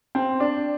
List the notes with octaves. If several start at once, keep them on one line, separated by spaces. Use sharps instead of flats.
C4
D4